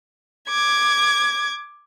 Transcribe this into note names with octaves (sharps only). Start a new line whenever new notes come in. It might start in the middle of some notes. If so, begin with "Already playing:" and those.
D6 G#6